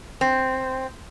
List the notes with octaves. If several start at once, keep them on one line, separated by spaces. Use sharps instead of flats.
C4